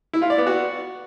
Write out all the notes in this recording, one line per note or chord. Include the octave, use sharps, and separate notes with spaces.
E4
F4
D5
B3
F#4